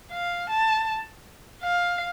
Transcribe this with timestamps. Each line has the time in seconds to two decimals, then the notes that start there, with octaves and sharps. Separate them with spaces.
0.12 F5
0.50 A5
1.63 F5